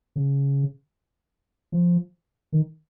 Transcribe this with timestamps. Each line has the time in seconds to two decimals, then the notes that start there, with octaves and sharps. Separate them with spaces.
0.16 C#3
1.72 F3
2.52 D#3